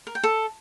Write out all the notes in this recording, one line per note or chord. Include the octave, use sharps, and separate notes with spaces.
A#4
G5
A4